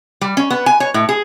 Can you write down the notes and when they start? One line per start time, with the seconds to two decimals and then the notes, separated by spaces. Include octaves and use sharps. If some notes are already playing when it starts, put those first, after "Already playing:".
0.21 G3
0.37 C#4
0.51 B3
0.66 G#5
0.80 C#5
0.94 A2
1.09 G#4